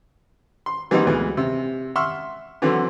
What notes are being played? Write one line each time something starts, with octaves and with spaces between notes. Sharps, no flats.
C6
E3 G3 A#3 C4 D#4 F#4
D2 B2 E3 G#3
C3
E5 F#5 C6 C#6 E6 F6
D3 E3 F#3 C4 F#4